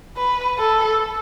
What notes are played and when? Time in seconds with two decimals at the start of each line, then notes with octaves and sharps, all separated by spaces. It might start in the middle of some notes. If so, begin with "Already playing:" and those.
0.17 B4
0.58 A4